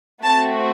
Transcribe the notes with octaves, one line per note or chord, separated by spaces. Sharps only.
A3 C4 F#4 A5